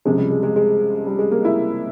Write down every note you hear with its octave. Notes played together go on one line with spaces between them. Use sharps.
C#2 C3 F3 G#3
G3
G#3
G#3
G#3
G3
G#3
A#3
E4